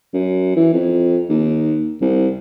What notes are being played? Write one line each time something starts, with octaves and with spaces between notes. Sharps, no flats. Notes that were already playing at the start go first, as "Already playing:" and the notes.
F#2
E3
F2
D#2
C2